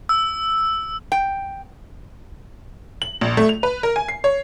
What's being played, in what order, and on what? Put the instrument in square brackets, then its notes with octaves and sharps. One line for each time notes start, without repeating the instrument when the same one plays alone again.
[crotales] E6
[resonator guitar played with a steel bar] G5
[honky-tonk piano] F#7
A#1
A3
F7
B4
A#4
G#5
C7
C#5